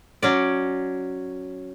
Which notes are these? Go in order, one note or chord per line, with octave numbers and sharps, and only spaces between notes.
F#3 C#4 D5